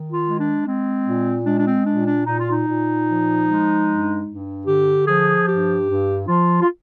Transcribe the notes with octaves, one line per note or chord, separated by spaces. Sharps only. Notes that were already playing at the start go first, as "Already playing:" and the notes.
Already playing: D#3
F4
G#3
D4
G#3 C4
A#2
G#3 D4
D4
C4
A#2 D4
D4
A#2 D#4
F4
D#4
A#2
F3
G#3
G2
G2
D3 G4
F3 G#4
G2 G4
G2
F3 F4
F4